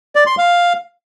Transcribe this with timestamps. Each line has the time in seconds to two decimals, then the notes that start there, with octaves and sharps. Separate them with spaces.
0.15 D5
0.27 C6
0.38 F5